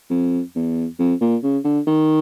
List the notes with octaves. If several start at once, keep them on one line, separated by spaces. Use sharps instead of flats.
F2
E2
F2
A#2
C#3
D3
D#3